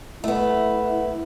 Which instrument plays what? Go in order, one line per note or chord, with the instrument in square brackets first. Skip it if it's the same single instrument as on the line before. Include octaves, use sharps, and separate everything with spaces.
[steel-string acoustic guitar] A3 B3 [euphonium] E4